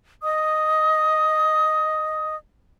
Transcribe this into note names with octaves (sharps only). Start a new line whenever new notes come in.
D#5 D#6